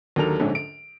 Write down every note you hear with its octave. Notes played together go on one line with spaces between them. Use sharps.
D#2 D3 F#3 A4 A#4 F7
A#1 G#2 D3 C#4 A4
D7